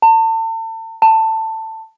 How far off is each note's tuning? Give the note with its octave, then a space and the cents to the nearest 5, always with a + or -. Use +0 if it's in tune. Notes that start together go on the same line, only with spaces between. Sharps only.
A5 +40
A5 +15